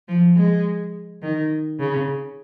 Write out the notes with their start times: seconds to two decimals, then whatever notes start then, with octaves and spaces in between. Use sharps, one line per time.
0.08 F3
0.36 G#3
1.22 D#3
1.79 C#3